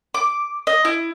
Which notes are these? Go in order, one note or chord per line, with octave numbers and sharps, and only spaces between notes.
D6
D#5
E4